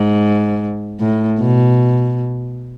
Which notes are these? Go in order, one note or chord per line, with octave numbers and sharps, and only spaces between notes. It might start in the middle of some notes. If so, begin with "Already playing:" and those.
Already playing: G#2
A2
B2